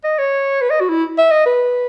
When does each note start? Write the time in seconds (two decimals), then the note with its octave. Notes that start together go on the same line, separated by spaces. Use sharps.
0.04 D#5
0.19 C#5
0.61 B4
0.70 D#5
0.80 F#4
0.89 E4
1.18 E5
1.31 D#5
1.46 B4